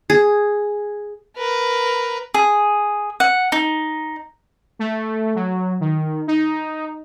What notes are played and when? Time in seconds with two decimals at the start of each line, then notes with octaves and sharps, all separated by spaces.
0.10 G#4
1.37 A#4 B4
2.34 G#4
3.20 F#5
3.52 D#4
4.79 A3
5.35 F#3
5.80 D#3
6.27 D#4